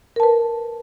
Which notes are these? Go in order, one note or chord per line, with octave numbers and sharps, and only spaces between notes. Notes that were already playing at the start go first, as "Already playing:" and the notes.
A#4 B4 A5